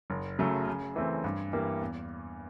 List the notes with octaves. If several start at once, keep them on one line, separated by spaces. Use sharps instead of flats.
F#1
F#2 C#3 F#3 A3
C#3
E3 A3 C4
G2
E3 G3 A#3
E2